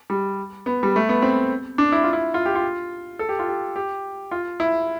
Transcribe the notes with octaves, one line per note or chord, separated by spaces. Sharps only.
G3
B3
G3
A3
B3
C4
D4
E4
F4
E4
F4
G4
F4
A4
G4
F4
G4
G4
F4
E4